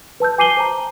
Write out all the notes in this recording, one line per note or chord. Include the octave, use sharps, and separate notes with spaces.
B4 A5 E6 G6
G#5 D6 C7 D#7 F#7 G7
C5 A5 A#5